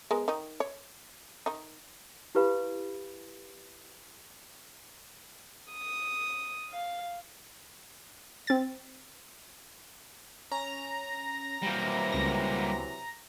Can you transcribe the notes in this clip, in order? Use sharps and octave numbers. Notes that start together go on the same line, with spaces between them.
G#3 B3 A#4
D#3 D#4
C#5
D#3 D#4
E4 G4 B4 F5 B5
D#6
F5
C4 A6
C#4 A#5
C3 E3 F#3 G3 A#3
C#2 A#6